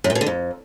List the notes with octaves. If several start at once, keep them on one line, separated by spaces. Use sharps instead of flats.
F#2
A#2
B2
D3
F2